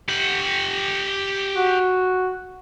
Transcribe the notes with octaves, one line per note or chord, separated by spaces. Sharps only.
G4 F#5
F#4